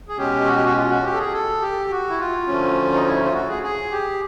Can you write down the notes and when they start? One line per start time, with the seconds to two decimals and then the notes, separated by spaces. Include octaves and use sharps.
0.09 G#4
0.17 B2 G#3 C#4 G4
0.47 F#4
0.56 G4
0.65 F#4
0.76 F4
0.90 F#4
1.04 G4
1.13 A4
1.18 G#4
1.33 A4
1.61 G4
1.91 F#4
2.10 E4
2.19 F4
2.47 D2 D3 F3 A3 C#4
2.94 D#4
3.05 E4
3.23 F4
3.33 F#4
3.48 G#4
3.63 G#4
3.91 G4